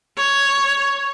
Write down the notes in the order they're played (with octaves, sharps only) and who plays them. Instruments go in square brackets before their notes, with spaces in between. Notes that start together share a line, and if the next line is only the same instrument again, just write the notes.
[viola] C#5